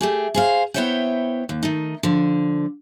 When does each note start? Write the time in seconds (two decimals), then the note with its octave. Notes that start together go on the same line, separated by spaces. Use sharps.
0.01 A3 G4 G#4
0.34 G#4 C5 F5
0.74 B3 E4 C5 C#5 E5 G5
1.49 D#2
1.63 D#3 A3 D#4
2.03 D3 F3